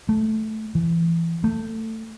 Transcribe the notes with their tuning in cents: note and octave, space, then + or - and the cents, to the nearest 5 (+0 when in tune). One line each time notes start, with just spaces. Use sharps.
A3 -10
E3 +20
A3 +20